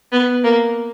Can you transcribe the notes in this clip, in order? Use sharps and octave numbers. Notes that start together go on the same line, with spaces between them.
B3
A#3